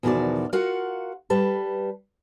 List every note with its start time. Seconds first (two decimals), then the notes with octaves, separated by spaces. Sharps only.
0.03 E2 B2 D#3 F3 F#4 D5
0.53 F4 F#4 A#4 F5 F#5
1.30 G3 B4 A5